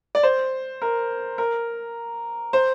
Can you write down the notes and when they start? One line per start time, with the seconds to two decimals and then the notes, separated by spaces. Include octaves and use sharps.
0.15 D5
0.23 C5
0.82 A#4
1.38 A#4
2.53 C5